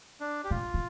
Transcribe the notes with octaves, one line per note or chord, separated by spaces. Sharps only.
D4
G4
C3 F4
C3